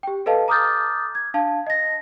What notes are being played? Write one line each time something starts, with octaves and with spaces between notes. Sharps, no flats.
G4 G5
A4 B4 D#5 F5 A5
A#5 D6 D#6 F6 G6 A6
G#6
D4 F5 A5
D#5 A#6